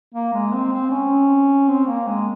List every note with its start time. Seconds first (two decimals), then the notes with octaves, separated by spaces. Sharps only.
0.14 A#3
0.33 G#3
0.53 C4
0.72 C4
0.90 C#4
1.68 C4
1.86 A#3
2.07 G#3